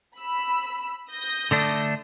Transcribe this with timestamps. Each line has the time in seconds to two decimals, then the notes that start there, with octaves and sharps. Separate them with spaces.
0.16 B5 E6
1.11 D#6 G6 A#6
1.51 D3 A3 D4